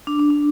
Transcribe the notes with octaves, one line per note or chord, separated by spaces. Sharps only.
D4
D4
D4